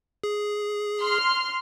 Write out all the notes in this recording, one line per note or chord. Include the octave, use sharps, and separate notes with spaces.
G#4
C6 F6